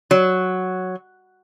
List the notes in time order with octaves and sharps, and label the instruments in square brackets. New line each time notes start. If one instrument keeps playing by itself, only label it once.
[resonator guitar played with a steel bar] F#3